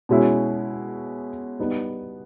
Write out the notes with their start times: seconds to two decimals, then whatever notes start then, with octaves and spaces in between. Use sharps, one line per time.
0.09 B2 G#3 C#4 E4
1.59 G3 B3 D#4